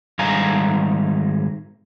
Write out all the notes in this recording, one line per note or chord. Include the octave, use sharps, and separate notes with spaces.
G#2 D#3 G3 F5 G#5 A#5